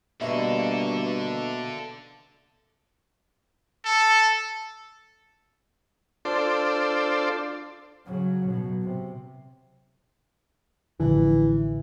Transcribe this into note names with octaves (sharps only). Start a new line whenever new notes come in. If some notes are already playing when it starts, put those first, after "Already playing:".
G2 B2 D3 A#3 A4 D#5 E5 C#6
A4
D4 F4 A4 C5 D5
C#3 F#3
B2 F#3
C3
A1 D3 E3 F3